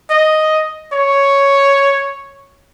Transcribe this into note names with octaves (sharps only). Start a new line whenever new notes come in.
D#5
C#5